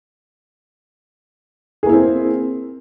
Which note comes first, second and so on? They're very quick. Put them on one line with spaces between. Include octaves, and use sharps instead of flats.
G#4 A#3 E4 C4